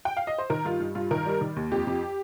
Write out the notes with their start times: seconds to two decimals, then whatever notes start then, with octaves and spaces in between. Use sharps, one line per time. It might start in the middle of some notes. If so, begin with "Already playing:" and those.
0.05 G5
0.17 F5
0.27 D#5
0.38 C5
0.50 D#3 A#4
0.65 G2 F4
0.80 G2
0.95 G2 F4
1.11 D#3 A#4
1.26 G3
1.41 D#3
1.56 D#2
1.72 F2 G4
1.87 F2